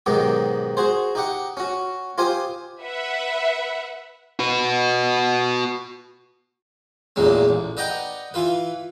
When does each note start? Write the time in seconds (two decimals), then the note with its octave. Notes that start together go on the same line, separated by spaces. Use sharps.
0.06 G#2 B2 D#3 F#3 G4
0.77 F#4 G#4 C5
1.15 D#4 G4 F#5
1.57 C#4 F#4
2.18 F4 G4 C5 G#5 D#6
2.82 B4 E5 F#5
4.39 F#4 B4
7.16 A1 E2 A#2 C#3 F#3 G#3
7.49 A1
7.77 B4 D5 D#5 F#5 G5 A#5
8.34 E3 F4 B4